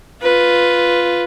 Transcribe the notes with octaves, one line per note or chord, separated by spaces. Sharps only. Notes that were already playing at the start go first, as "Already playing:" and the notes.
F4 B4